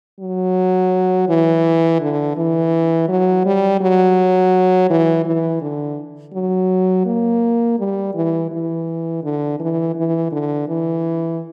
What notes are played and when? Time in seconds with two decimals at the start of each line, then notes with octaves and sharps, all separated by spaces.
0.20 F#3
1.29 E3
2.01 D3
2.37 E3
3.08 F#3
3.45 G3
3.81 F#3
4.90 E3
5.25 E3
5.61 D3
6.33 F#3
7.06 A#3
7.79 G3
8.15 E3
8.51 E3
9.24 D3
9.60 E3
9.96 E3
10.32 D3
10.68 E3